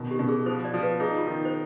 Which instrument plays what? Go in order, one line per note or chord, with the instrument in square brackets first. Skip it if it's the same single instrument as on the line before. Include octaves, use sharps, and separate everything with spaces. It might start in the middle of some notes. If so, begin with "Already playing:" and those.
Already playing: [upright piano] B2 D#3
[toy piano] G4
[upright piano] B2
[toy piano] G#4
[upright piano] F3 [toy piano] C5
[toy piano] D5
[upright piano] F3
[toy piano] B4
[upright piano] D#4 [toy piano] G#4
[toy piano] F4
[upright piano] D#3
[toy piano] C5